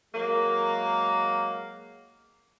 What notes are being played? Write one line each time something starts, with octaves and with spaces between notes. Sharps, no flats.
F#3 G#3 A#3